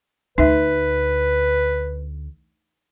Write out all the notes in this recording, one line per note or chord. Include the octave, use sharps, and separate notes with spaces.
D2 D#4 B4 E5